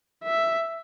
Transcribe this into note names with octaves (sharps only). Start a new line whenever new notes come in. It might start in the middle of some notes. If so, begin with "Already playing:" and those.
E5